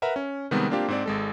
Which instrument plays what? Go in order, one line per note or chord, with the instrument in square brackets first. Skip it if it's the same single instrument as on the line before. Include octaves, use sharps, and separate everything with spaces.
[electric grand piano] A#4 B4 E5 F#5 A#5
C#4
C3 D#3 G3 G#3 B3 C4
A#3 C4 D4 F4 G4 F5
G#2 C4 D5
G#1 G#3 A4